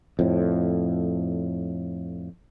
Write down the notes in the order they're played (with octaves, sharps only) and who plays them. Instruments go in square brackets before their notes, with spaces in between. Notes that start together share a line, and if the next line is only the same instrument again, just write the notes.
[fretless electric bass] F2 A2